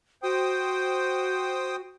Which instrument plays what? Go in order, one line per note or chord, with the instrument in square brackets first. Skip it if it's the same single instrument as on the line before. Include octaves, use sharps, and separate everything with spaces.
[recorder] F#4 [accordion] C5 G5 D#6